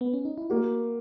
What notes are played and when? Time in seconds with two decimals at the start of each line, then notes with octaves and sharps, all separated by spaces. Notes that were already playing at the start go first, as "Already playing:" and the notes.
0.01 B3
0.13 C#4
0.25 D#4
0.38 E4
0.50 A#3 F#4